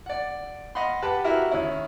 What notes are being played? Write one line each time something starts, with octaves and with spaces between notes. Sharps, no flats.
D5 F#5
D#5 F5 F#5 B5 C6
G4 B4 F#5 A5
E4 F#4 G4 A#4 E5
D#3 C#4 E4